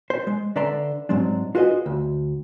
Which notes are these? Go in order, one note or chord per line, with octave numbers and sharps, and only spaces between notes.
C5
G#3
D3 B4 D5 E5 A#5 C6
G#2 F#3 G#3 C4 D4
F4 F#4 G#4 B4 C5 D#5
D2